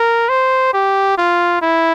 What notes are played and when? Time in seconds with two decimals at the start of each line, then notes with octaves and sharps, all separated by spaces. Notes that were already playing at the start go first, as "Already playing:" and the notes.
Already playing: A#4
0.29 C5
0.73 G4
1.18 F4
1.61 E4